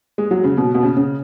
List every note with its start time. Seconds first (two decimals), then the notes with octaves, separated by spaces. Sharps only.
0.18 G#3
0.31 F#3
0.44 C#3
0.57 B2
0.74 B2
0.83 C#3
0.96 C#3